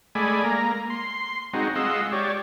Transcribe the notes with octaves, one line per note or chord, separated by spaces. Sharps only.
G#3 A3 D5 G#5 B5
A#3 A#5
C6
G#3 C4 D#4 F#4
G#3 F4 D#5 F#5 C6 E6
G4 C#5 D5